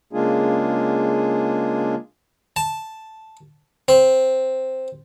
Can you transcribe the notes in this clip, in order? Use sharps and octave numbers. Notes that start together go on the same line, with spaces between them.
C#3 G#3 A#3 D4 F4 G#4
A5
C4